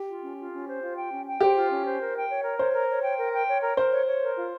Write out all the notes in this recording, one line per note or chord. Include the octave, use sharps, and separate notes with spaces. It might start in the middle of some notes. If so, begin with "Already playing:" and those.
Already playing: G4
F4
C#4
F4
C#4
C5
F4
G5
C#4
G5
G4 C5
F4
C#4
C5
A#4
G5
C#5
A#4
C5 C#5
A#4
C#5
G5
A#4
G5
C#5
A#4
A#4 C5
C#5
C#5
A#4
F4